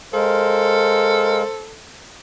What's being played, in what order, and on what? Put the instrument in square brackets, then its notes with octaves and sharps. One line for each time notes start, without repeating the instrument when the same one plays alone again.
[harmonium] G#3 A#4 F5 [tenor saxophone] A4 [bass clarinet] C5